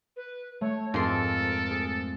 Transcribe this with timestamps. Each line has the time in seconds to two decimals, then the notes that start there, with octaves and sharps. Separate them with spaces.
0.16 B4
0.61 A3 C#5
0.94 F2 G#2 A4 A#4 C6
1.71 G#4